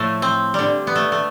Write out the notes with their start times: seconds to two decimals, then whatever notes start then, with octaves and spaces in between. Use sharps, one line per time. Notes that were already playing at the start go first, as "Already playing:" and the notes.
Already playing: A2 F3 A3
0.22 C4
0.54 D3 G3
0.87 B3
0.96 A3
1.12 A3